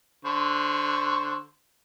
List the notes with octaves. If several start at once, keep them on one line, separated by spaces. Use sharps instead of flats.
D3 C5 C#6